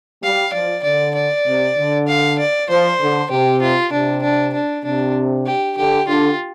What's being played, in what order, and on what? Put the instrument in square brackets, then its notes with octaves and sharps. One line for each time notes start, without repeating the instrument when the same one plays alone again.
[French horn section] G3 [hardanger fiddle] F5
[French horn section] F3 [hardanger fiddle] D5
[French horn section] D3 [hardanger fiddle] D5
[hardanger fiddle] D5
[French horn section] C3
D3
[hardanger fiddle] F5
D5
[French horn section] F3 [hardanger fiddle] C5
[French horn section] D3
[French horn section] C3 [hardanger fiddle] G4
[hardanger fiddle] F4
[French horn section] C3 [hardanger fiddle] D4
[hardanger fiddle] D4
D4
[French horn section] C3 [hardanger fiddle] D4
[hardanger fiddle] G4
[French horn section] D3 [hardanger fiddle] G4
[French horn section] D3 [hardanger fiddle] F4